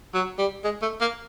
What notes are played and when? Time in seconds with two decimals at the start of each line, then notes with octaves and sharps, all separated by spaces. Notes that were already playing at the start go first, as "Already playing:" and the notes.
0.14 F#3
0.39 G3
0.64 G#3
0.82 A3
1.01 A#3